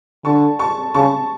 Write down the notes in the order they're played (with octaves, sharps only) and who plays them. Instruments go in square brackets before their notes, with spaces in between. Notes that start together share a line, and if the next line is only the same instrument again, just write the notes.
[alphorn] D3 [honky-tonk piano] A5 C#6
[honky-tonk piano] A5 C#6
[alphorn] C#3 [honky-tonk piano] A5 C#6